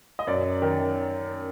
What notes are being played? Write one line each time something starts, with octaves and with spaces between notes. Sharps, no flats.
D#5
F#2 D5
D#3